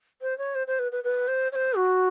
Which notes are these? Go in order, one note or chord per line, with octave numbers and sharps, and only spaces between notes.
C5
C#5
C5
C5
B4
B4
B4
C5
C#5
C5
F#4